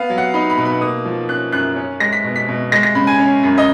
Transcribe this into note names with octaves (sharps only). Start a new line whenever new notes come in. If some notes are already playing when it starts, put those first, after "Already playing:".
Already playing: B3 F5
F#3
F#5
D#4 B5
B5
B2
B5
A#3 D#6
F3
C#4 F#6
F#2 F#6
C#4
G#3 A#6
B6
B2
B6
B2
G#3 A#6
A#6
C#3 B5
G#5
C#4
F#2
D#5